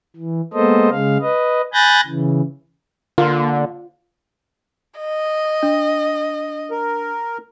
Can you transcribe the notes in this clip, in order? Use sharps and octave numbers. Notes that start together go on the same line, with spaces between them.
E3
G#3 A#3 B3 A4 C5 D#5
C#3 G#3 F5
B4 D#5
G#5 B5 F#6 G6 A6 A#6
C#3 E3
D3 A#3 F4
D#5
D4
A#4